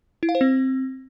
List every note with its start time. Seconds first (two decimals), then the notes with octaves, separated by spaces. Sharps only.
0.23 E4
0.29 F5
0.35 C5
0.41 C4